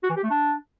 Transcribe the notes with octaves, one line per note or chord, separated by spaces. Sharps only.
F#4
E3
G4
A3
D4